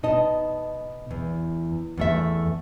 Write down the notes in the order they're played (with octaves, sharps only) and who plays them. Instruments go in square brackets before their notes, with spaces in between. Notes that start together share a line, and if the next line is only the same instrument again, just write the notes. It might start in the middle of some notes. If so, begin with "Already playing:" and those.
[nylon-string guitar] B2 D#4 D#5 A5
E2
E2 A3 E5